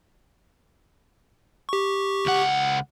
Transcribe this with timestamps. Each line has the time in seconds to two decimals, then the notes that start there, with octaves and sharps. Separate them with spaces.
1.69 G4 C#6
2.26 C#2 F#5